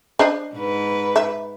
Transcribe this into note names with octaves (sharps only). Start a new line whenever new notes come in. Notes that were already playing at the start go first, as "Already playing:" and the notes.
D4 C5 D#5
G#2 B4
E5